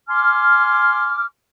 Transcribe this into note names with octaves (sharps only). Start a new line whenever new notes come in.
G#5 C6 D6 F6